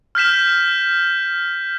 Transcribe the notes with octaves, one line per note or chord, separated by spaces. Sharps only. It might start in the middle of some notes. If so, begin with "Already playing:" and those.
F6 G6 B6 E7